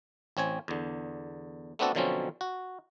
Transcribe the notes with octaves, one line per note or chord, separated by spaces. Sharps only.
A1 C4 C#5 G#5
E2 D3
A3 B3 C4 D4 F#4 A4
B2 D3 F3 F#3 C4 C#4
F#4